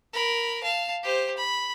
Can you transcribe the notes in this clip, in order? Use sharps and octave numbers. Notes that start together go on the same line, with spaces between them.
A#4 B5
F5 A5
G4 C5
B5